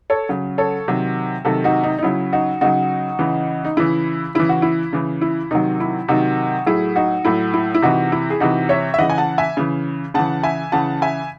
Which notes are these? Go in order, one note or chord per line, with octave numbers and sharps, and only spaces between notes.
A4 C#5
C#3 F#3
A4 C#5
C3 D#3 F#3
C3 D#3 F#3 F#4 A4
D#4 F#4
D#4
D#4
C#3 F#3 E4
D#4 F#4
C#3 F#3 D#4 F#4
C#3 E3
D#4
C#3 E3 E4
C#3 E3 E4
F#4
E4
C#3 E3
E4
C3 D#3 F#3 D#4
E4
C3 D#3 F#3 D#4 F#4
A2 F#3 E4 G#4
D#4 F#4
A2 F#3 E4
E4
E4
C3 E3 D#4 F#4
E4
G#4
C3 E3 D#4 F#4
C#5 E5
E5
C#3 E3 D#5 F#5
G#5
F#5 A5
E5 G#5
C#3 E3
C#3 E3 F#5 A5
E5 G#5
C#3 E3 F#5 A5
E5 G#5